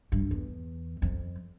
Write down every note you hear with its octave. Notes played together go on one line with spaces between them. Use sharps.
G2
E2
F2